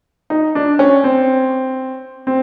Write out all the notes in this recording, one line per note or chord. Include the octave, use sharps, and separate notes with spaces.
D#4
D4
C#4
C4
C4